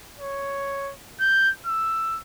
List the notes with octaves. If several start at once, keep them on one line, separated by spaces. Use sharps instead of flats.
C#5
G6
E6